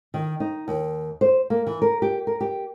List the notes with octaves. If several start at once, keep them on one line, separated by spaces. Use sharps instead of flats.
D#3
D#4
D#2
C5
A#3
E3
A#4
G4
A#4
G4